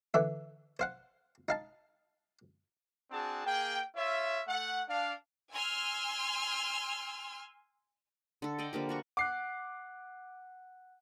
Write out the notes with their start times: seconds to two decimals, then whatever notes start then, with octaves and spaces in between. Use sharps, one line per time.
0.14 D3 E3 E5
0.79 C5 F5 F#5
1.48 D#4 F5 A5
3.11 C4 D4 F#4 G#4 A5
3.46 A#3 G#4 G5
3.96 F4 C#5 E5
4.48 A3 F#5
4.88 D4 F5
5.52 G#5 C6 E6 F6
8.42 D3 A4
8.58 D5 D#5 G5
8.73 D3 F3 A#3 G4
8.89 G3 F#4 C#6
9.17 F#5 D6 F#6 C7